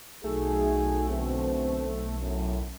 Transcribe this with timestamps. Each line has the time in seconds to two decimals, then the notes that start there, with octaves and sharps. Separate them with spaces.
0.24 B1 A3 D#4 F#4 G#4
1.08 D2 B2 C4
2.19 F#2 A2